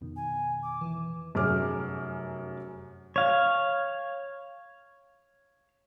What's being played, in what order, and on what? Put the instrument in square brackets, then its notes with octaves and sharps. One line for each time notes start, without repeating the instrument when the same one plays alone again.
[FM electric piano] F2 B2 D#3
[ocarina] G#5
D6
[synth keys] E3
[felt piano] F1 F#2 G#4 D6 F6
[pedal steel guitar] C#5 F5